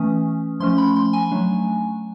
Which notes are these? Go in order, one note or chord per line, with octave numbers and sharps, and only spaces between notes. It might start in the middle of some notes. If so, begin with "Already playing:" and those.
Already playing: E3 A3 C#4 D#6
F3 A3 C#4 C6
B5
C6
G#5
F#3 A3 D4